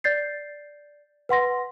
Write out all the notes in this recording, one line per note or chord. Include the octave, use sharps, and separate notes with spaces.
D5 G6 A6 C7
B4 F#5 C6 A#6